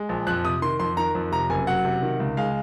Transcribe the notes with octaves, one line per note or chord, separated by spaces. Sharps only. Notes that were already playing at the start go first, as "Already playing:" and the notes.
Already playing: G#3
A#1
F2 F#6
C3 D#6
D#3 C6
F2 C6
D#3 A#5
F2
C3 A#5
F#1 G#5
F#3 F#5
C3
D#3
C#2
G#3 F5